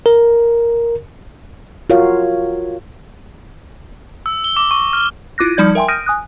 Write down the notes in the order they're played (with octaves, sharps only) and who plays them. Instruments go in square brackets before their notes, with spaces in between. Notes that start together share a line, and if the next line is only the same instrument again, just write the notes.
[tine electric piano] A#4
[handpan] F4 F#4 A#4 C#5 F5
[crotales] E6
G7
D6
C#6
F6
[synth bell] E4 F4 D6 F#6 A#6
F3 G3 D#4 D5 G6 G#6
A#4 E5 G5 G#5 C6
D#6 F6 G6 A#6 D7 D#7
G#5 D#6 F#6